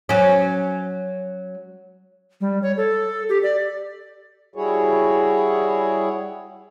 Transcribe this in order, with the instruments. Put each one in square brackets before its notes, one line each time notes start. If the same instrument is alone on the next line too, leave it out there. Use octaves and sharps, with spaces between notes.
[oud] F#3 C#4
[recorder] G3
C#5
A4
G4
D5
[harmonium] G3 E4 F#4 G#4 C#5